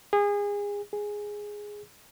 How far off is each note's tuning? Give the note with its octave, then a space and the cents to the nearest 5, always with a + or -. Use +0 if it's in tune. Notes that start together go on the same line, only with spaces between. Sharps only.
G#4 -30
G#4 -5